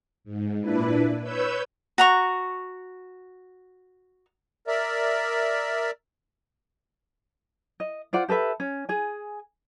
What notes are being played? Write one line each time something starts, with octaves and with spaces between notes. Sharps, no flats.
G#2
A#2 D4 E4 B4
B4 C#5 E6 G6
F#4 A#5 C#6
A#4 D5 E5
D#5
F4 C5 D5 F#5
G4 A4 B4 E5
C#4
G#4 G#5